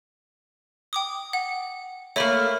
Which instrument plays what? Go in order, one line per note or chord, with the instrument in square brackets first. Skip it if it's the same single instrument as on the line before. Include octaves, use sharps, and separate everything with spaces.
[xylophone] G5 D6 D#6
F#5
[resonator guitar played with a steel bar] A3 A#3 [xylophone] C#5 E5 B5